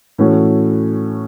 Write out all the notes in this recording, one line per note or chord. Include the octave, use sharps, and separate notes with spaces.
A2 E3 A3 C#4 F#4